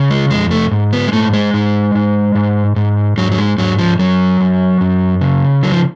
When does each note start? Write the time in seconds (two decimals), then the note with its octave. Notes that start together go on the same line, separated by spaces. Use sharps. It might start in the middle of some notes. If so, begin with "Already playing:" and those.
Already playing: C#3
0.10 G#3
0.31 F2 G#3
0.51 A3
0.71 G#2
0.93 B3
1.07 G#3
1.12 G#2 A3
1.34 G#3
1.54 G#2
1.95 G#2
2.35 G#2
2.76 G#2
3.17 G#2 F#3
3.32 F#3
3.38 G#3
3.58 G#2 F#3
3.79 F3
3.99 F#2 F#3
4.41 F#2
4.81 F#2
5.21 C#3
5.63 D3 F#3
5.72 F3